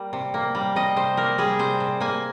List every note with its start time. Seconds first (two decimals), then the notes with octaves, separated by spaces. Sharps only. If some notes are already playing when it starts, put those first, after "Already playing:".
Already playing: G3 A#3
0.13 C3
0.34 A#3
0.55 G3
0.76 C3 D#5
0.96 C3 C5
1.17 A#3 A#4
1.38 G3 G#4
1.59 C3 C5
1.80 C3
2.00 A#3 G#5